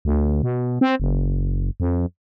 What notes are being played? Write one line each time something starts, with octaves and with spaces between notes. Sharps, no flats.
D2
B2
C4
F#1
F2